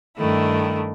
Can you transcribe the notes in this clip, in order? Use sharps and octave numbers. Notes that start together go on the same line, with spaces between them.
G2 D#3 A3 D4 E4